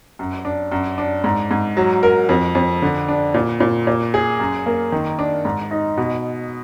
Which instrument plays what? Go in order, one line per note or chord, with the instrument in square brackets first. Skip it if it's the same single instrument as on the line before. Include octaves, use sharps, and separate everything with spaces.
[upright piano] F#2
D4
F#2
D4
G#2
G#2
F#3
A#4
F2
F2
D3
D4
A#2
A#2
A#2
G#4
F#2
A#3
D#3
D4
G#2
D#4
B2